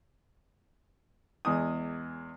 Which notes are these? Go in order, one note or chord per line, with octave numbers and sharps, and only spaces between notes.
E2 G#3 D#6